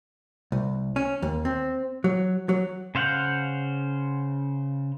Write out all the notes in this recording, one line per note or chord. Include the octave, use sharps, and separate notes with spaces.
C2
C#4
D#2
C4
F#3
F#3
C#3 C5 F5 F#5 G6